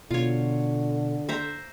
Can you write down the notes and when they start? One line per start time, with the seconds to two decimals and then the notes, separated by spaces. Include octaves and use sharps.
0.11 B2 D3 F4 C#5
1.29 C5 E5 A#5